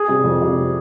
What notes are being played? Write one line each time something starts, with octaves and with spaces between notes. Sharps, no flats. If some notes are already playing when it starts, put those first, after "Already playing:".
Already playing: G#4
C3 G3
F2
C3 G3